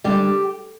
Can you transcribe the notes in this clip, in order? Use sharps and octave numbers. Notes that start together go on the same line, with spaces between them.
D3 G3 D4 G4